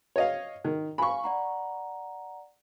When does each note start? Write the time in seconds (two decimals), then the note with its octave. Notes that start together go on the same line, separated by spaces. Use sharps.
0.16 C#5 D#5 F5
0.64 D#3
0.98 F5 G#5 B5 C#6
1.24 D5 F#5 A#5